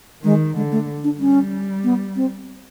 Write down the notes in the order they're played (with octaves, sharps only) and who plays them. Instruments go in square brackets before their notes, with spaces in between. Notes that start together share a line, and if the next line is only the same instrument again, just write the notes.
[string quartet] D#3 [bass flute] G#3
[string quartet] D3 [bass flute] G#3
[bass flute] A3
D4
[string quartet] G3 [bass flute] C#4
[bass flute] B3
C4